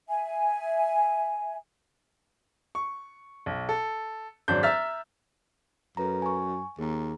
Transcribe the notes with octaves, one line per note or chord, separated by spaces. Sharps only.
E5 G#5
C#6
B1
A4
G#1 F#3 D4 C5 G6
E5 A#5 E6 F6 A6 B6
F#2 A4 B4 A#5
G#5 C#6
D#2 G#4 A#5